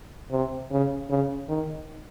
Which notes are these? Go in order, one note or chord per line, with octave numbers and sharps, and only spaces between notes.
C3
C#3
C#3
D#3